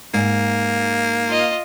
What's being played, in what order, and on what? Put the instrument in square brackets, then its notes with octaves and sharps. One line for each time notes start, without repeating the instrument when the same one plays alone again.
[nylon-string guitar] G#2 [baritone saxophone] A#3
[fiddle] F4 D#5